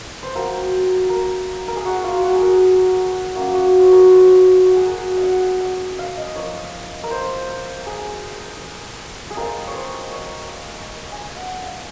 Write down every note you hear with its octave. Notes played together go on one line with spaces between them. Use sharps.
C5
F#3 C4 F4 A#4
A#4
A#4
G#4
F#4
F4
F#4
G#4
A#4
F#3 A#3 C#4 F4 F#4
F#4
C5
A#4
C5
F#4
G#4
A#4
F5
F#5
F#5
F5
D#5
F3 A#3 F4 C#5
A#4
C5
G#4
G#4
G#3 C4 F4 A#4
C#5
C5
C#5
G#5
F#5
F5